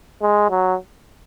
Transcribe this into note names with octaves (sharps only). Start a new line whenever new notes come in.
G#3
F#3